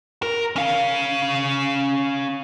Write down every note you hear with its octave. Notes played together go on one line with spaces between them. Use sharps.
A#4
C#4 F5